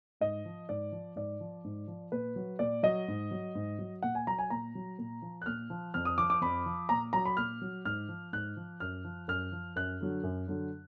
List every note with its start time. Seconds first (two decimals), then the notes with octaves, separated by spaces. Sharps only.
0.21 G#2 D#5
0.45 F3
0.69 G#2 D5
0.92 F3
1.16 G#2 D5
1.40 F3
1.64 G#2
1.87 F3
2.12 A#2 B4
2.36 F#3
2.59 A#2 D5
2.83 F#3 D#5
3.08 G#2
3.31 F#3
3.55 G#2
3.79 F#3
4.03 A#2 F#5
4.15 G#5
4.27 F#3 A#5
4.39 G#5
4.50 A#2 A#5
4.75 F#3
4.99 A#2
5.22 F3
5.42 F#6
5.46 A#2 F6
5.70 F3
5.94 F2 F6
6.05 D#6
6.18 F3 D6
6.30 D6
6.41 F2 B5
6.66 F3
6.89 A#2 A#5
7.13 F#3 A#5
7.25 B5
7.37 A#2 F6
7.62 F#3
7.85 G#2 F6
8.09 F3
8.33 G#2 F#6
8.56 F3
8.80 F#2 F6
9.04 F3
9.28 F#2 F6
9.52 F3
9.76 F#2 F#6
10.01 D3 F#3
10.23 F#2
10.48 D3 F#3